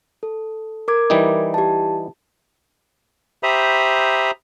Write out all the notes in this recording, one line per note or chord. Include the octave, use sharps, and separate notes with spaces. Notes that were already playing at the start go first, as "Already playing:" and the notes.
A4
A#4 D6 G#6
E3 G3 D#4
G4 A5
G4 C5 E5 A#5 B5 D#6